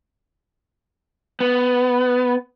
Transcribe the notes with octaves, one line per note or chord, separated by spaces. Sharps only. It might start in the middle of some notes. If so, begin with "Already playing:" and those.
B3